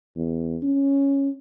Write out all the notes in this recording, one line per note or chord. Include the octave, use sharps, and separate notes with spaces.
E2
C#4